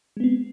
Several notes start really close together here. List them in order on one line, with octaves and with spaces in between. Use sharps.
G#3 B3 C4